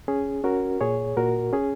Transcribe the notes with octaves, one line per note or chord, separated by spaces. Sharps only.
C#4 G#4
C#4 F#4 A#4
A#2 G#4 C#5
A#2 F#4 A#4
C#4 G#4